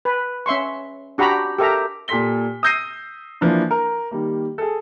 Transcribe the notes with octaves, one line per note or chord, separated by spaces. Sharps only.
B4
C#4 E5 C6 C#6
D4 F#4 G4 A#5 B5
G4 A4 A#4 E5 A#5
A#2 G4 A4 C6 B6 G7
D#6 E6 G6 A#6 C7 D#7
E3 F3 A#3 D4 E4
A#4 A#5
D#3 G3 A#3
G#4 A4